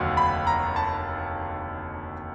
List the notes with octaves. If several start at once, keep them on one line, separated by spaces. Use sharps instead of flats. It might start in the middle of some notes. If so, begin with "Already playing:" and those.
Already playing: F1 D#2 D3 F#3 F#5
B5
A#5
A5